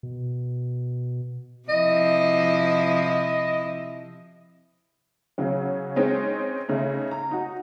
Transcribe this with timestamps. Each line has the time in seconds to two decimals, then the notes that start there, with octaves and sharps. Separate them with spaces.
0.03 B2
1.69 C3 F3 E4 D#5
5.38 C#3 F#3 C#4
5.96 G#3 C4 C#4 D#4
6.69 C#3 A3 D#4
7.11 A#5
7.31 D#4 F#4